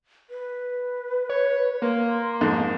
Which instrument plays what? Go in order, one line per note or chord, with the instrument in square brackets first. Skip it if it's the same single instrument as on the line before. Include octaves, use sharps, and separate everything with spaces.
[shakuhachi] B4
[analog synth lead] C#5
[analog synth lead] A#3 [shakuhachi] C6
[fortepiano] F2 G#2